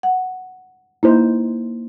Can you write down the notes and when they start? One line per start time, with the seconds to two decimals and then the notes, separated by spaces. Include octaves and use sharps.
0.03 F#5
1.03 A#3 D#4 E4 C5